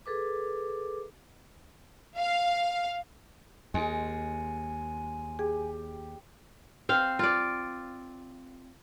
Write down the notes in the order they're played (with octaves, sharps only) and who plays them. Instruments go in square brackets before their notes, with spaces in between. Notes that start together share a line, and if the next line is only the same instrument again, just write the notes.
[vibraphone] G#4 A4 B4 D6
[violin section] F5
[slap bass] D#2 [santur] G#3 [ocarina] G#5
[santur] G4 [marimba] G#4
[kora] C4 F5
F4 D5